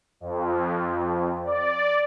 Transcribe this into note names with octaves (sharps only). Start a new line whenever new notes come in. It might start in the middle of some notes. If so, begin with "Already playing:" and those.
F2
D5